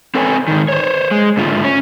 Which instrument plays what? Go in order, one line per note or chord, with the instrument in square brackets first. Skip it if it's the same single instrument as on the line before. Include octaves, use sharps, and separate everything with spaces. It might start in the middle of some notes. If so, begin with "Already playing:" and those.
[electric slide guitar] C4 A4 B4 C#5 G#5
G#2 D#3
C5 C#5
G#3
G#2 D3 A3 F4
C#4